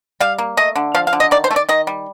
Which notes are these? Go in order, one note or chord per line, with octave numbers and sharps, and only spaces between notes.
G3 F5
A#3
A3 D#5
D3
F3 F5
F5
D3
D#5
D#3 D5
C5
A3
D5
D#3 D#5
G3